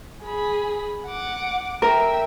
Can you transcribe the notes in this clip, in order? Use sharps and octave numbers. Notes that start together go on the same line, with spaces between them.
G#4 B5
F#5 D6
A#4 E5 G5